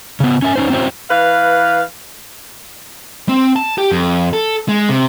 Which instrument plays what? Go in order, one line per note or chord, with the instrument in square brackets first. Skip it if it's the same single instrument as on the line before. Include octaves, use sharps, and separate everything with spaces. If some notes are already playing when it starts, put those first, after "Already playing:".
[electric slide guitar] C#3 B3
C#4 E5 G#5
C#4 D#4 C5
C4 C#4 E4 F#4 C5 G5
[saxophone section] E3 B4 F5
[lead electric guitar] C4
A5
G4
F2
A4
G#3
C3